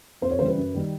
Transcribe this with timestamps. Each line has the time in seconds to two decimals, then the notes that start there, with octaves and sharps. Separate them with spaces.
0.22 F2 C5
0.31 C#5
0.39 C#3 E3 G3 C5
0.48 B4
0.57 F#2
0.74 D#3 G3